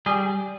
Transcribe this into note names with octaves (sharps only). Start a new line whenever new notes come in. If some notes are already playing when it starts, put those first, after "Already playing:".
G3 G#4